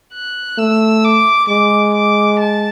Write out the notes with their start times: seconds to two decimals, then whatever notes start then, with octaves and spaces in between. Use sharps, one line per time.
0.13 F#6
0.58 A3 E6
1.04 D6
1.48 G#3 D6
1.94 D6
2.39 A5